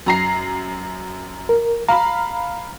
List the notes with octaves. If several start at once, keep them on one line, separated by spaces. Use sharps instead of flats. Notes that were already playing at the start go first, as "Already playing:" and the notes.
F#2 A#5 C7
A#4
F5 A#5 B5